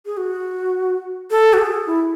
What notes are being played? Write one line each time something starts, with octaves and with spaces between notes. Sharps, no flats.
G#4
F#4
A4
F#4
G#4
E4